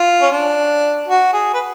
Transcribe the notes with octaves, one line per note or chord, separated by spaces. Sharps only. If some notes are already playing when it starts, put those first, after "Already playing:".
Already playing: F4
C#4
D4
F#4
G#4
B4